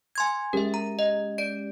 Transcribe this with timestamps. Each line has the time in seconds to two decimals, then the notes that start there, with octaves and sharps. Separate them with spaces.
0.15 G#5 C6 G#6
0.53 G#3 C#4 G4 A#4 E5
0.74 A#5
0.99 D#5
1.38 D5 D7